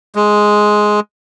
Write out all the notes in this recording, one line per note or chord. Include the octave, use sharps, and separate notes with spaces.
G#3